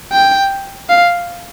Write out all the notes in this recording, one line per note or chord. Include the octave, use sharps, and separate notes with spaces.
G5
F5